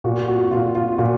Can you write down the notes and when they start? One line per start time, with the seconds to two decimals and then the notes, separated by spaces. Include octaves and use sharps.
0.04 A#2 F#4
0.28 F#4
0.51 A#2 F4
0.75 F4
0.98 A#2 F#4